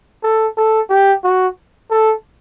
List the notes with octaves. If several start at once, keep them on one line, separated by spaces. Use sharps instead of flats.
A4
A4
G4
F#4
A4